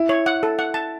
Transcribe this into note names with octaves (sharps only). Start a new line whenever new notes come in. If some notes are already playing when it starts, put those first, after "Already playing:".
Already playing: E4
C#5
F#5
A4
F#5
A5